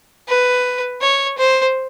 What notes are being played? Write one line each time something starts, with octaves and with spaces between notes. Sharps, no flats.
B4
C#5
C5